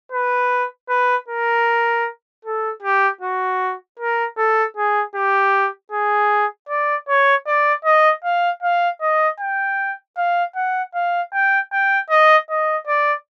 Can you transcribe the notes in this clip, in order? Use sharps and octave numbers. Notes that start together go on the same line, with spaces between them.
B4
B4
A#4
A4
G4
F#4
A#4
A4
G#4
G4
G#4
D5
C#5
D5
D#5
F5
F5
D#5
G5
F5
F#5
F5
G5
G5
D#5
D#5
D5